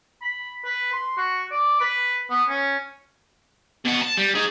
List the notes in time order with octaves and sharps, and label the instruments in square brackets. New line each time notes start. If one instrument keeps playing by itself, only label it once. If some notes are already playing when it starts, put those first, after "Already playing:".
[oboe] B5
B4
C6
F#4
D5
B4
B3
C#4
[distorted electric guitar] B2 F#5
A5
G3
D#4 G#4